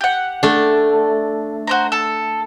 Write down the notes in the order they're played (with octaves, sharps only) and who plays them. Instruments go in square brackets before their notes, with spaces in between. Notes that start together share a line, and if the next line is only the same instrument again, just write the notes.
[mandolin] G4 F#5
[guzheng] A3 D4
[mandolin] F#4 C5 A#5
A4